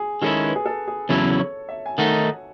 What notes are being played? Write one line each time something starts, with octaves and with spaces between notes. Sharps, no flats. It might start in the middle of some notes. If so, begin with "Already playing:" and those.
Already playing: G#4
D#3 G#3 C#4 E4 A4
B4
G#4
A4
G#4
E2 C#3 F#3 C#4 E4 A4
C#5
E5
G#5
D#3 A3 D#4 F#5